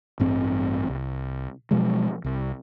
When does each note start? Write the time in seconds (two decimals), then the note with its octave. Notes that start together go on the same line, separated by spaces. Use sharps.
0.20 A1 G2 C4
0.89 C2
1.71 B2 F3 F#3 G#3
2.24 C2